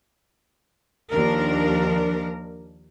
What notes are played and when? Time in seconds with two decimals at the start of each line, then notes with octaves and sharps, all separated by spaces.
1.12 D#2 F3 D4 A#4